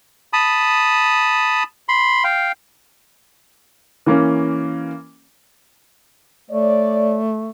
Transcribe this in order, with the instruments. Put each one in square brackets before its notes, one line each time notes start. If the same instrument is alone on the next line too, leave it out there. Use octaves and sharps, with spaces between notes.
[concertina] A5 B5 D#6
B5 C6
F5 G5
[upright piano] E3 A#3 C#4
[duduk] A3 [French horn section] C#5 D5